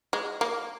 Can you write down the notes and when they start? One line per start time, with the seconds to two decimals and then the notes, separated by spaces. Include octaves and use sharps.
0.13 G#3
0.41 A#3